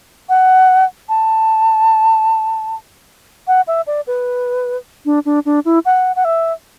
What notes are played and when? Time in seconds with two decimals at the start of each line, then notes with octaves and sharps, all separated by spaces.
0.29 F#5
1.09 A5
3.47 F#5
3.67 E5
3.87 D5
4.07 B4
5.05 D4
5.25 D4
5.46 D4
5.65 E4
5.85 F#5
6.16 F#5
6.25 E5